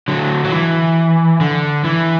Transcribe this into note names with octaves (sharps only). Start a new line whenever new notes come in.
D3 F#3
F#3
E3
D3
E3